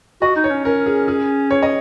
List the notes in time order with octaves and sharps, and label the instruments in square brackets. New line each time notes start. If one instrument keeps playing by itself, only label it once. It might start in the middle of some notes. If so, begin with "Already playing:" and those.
[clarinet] F#4 [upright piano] D#5
[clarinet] D#4
[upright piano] C#5
[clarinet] C#4
[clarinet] C#4 [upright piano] A#4
[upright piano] G#4
G#4
C#5
D#5